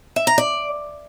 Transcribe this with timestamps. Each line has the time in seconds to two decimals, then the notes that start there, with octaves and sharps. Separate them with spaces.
0.16 E5
0.27 A#5
0.38 D5